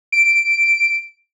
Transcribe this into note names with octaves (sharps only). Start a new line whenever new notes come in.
D7